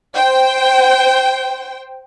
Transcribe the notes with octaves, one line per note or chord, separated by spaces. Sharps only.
C5 G5